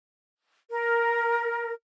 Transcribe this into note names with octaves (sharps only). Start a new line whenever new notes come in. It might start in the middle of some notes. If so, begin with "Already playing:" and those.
A#4